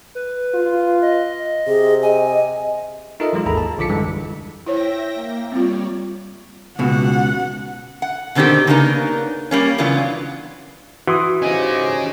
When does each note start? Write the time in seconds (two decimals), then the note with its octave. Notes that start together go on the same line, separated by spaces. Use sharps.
0.15 B4
0.55 F4
1.02 D#5
1.67 C3 G#4
2.03 D#5 G#5
3.20 D#4 F4 A4 A#4 D#5 E5
3.33 E3 F#3 G#3 F4
3.46 G#1 D#2 G#4 A4 A#5 B5
3.57 A5
3.78 A#1 D3 F4 D6 B6 C#7
3.89 F#2 D3 E3 G3 G#3
4.66 E4 C5 C#5 E5 G5 A#6
5.14 A#3
5.52 G3 C4 F4 C#5 D5
6.79 C#2 B2 F#5
8.02 F#5
8.35 B2 D3 D#3 C4 D4 G4
8.67 C#3 A#3 B3 D4 D#4 A#4
9.51 G3 A#3 C#4
9.78 C#3 E3 F#3 B3 D4 F4
11.07 E3 F#4 C6 D#6
11.42 G#2 C#4 G4 G#4 D#5